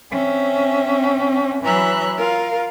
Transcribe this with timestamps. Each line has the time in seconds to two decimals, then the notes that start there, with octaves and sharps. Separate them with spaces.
0.11 C4 C#4 E5
1.62 E3 F#3 C#5 E5 A#5 F#6
2.17 F4 A#4 F5